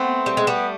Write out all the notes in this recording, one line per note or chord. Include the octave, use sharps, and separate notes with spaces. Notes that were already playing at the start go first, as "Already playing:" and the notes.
Already playing: A3 B3 C4
G3
G#3
G3 A3 B3